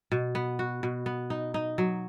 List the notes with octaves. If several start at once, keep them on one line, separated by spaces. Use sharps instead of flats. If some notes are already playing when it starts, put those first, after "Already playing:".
B2
B3
F#4
B2
B3
D#4
D#4
F#3